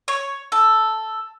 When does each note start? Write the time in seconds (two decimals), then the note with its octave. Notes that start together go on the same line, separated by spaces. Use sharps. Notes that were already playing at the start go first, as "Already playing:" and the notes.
0.08 C#5
0.52 A4